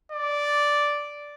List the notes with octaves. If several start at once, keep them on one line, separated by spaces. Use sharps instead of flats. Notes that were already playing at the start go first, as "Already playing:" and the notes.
D5